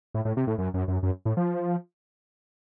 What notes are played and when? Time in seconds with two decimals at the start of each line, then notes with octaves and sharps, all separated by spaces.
0.14 A2
0.25 A2
0.37 C3
0.47 A2
0.58 F#2
0.74 F#2
0.88 F#2
1.03 F#2
1.25 A2
1.37 F3